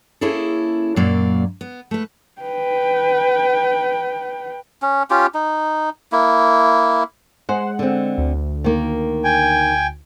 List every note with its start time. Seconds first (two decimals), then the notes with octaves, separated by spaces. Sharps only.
0.21 A#3 C#4 E4 G#4 A4
0.96 F#2 A#2 F#3 A#3 D5
1.61 B3
1.91 A3 B4
2.42 B4 G5
4.82 C#4
5.10 C#4 F4 G4
5.34 D#4
6.12 A#3 E4
7.49 G#3 C5 F#5
7.79 D3 C4
8.18 D2
8.64 D#3 A#3
9.24 G5 G#5